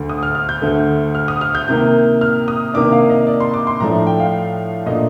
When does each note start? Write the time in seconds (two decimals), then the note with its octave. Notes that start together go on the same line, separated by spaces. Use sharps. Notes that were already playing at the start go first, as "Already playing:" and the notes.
Already playing: D2 D3 A3
0.09 D#6
0.23 F6
0.35 F6
0.49 G6
0.62 D2 D3 A3
1.15 F6
1.28 D#6
1.41 F6
1.55 G6
1.68 C3 D#3 A#3 G6
2.21 F6
2.48 D#6
2.74 C3 D#3 A#3 D4 D6
2.92 F5
3.10 D#5
3.27 D5
3.40 C6
3.54 D6
3.67 C6
3.80 A2 F3 A3 D4 A#5
4.07 G5
4.20 F5
4.86 A#2 A3 D4 D#5